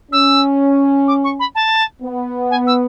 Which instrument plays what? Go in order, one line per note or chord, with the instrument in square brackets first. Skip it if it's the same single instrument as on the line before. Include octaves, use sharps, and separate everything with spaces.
[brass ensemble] C#4 [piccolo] E6
[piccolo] D6
C#6
B5
A5
[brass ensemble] B3
[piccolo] G#5
E6